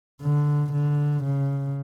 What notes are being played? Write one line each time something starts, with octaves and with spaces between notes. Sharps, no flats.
D3
D3
C#3